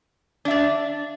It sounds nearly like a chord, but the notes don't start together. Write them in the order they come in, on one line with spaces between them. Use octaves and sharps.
D4 E5 D5